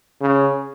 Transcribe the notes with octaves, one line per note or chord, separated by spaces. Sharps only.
C#3